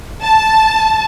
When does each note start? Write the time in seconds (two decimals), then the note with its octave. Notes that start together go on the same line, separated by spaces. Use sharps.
0.22 A5